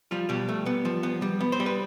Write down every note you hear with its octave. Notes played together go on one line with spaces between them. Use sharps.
F3 G3 F4
B2 G3 G4
A3
B3
F3
B3
G3
B3
C5
G3
B4